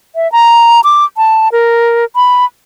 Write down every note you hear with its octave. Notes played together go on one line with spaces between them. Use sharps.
E5
A#5
D6
A5
A#4
B5